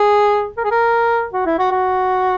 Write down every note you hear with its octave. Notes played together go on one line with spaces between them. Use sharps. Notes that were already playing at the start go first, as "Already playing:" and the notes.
Already playing: G#4
A#4
G#4
A#4
F#4
E4
F#4
F#4